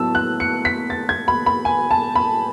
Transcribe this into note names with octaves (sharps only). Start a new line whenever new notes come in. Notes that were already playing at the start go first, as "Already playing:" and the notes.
Already playing: A2 F#3 B3 A5 E6
F#6
C#7
B6
A6
G#6
B5
B5
G#5
A5
B5